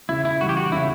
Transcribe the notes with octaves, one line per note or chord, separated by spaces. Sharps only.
C#3 E4
E4
E3 G3 F#4
G4
F#4
C#3 E4